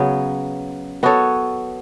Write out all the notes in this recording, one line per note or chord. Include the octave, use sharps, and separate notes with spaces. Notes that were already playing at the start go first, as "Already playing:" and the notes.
Already playing: C#3 F#3 B3
B3 F#4 A4 C#5